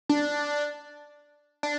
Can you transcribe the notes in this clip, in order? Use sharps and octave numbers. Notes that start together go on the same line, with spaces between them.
D4
D4